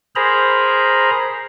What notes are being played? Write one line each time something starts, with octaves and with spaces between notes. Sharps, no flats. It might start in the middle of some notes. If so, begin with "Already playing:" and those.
G#4 A#4 C5 A#5 B5